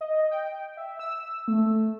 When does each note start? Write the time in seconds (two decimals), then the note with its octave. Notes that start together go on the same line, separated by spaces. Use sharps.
0.01 D#5
0.31 G5
0.77 E5
0.99 E6
1.48 A3